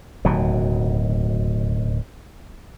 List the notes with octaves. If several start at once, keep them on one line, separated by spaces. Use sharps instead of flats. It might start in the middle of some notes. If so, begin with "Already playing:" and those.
D1 D#2 B2 F#3